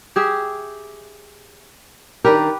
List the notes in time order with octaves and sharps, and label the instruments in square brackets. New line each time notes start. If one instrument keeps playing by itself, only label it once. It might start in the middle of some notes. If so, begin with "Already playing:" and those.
[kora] G4 G#4 E5
[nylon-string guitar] D#3 D4 A#4 [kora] G4 B4